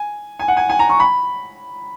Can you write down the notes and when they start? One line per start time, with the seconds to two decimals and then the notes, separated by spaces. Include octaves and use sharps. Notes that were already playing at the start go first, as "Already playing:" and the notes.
Already playing: G#5
0.39 G#5
0.48 F#5
0.57 G#5
0.69 G#5
0.79 A#5
0.90 C#6
1.00 B5